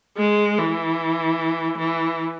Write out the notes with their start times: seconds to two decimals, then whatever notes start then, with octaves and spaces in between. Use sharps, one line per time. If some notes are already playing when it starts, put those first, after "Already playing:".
0.18 G#3
0.58 E3
1.79 E3